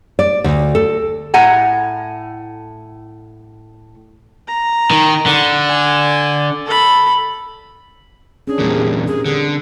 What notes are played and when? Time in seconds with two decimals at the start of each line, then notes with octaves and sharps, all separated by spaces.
0.19 D5
0.44 D2
0.75 A4
1.34 A2 F#5 G#5 A#5
4.48 A#5
4.91 D#3
5.26 D3
5.69 G#5
6.66 A4 B5
8.47 C#4 D4 G#4
8.59 E2 A#2 G3 C4 A#4
9.07 G#4
9.26 D3 G#4